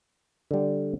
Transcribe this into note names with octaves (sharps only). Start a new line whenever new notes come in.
D3 G3